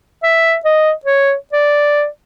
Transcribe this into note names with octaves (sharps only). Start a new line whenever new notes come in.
E5
D#5
C#5
D5